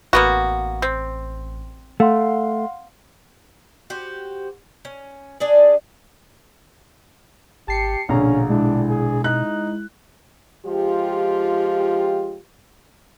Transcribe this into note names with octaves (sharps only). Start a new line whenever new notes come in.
A1 A#3 B3 F#4
C4
A3 F5 F#5 C6
F#4 G4 C5
C#4
D4 G#4 D5
G#1 G4 A5 C7 C#7
A#1 B2 D3 C#4 F5 A#5
G#3 D4 E4
G#4
D#4 F#6
F3 G#3 F4 G4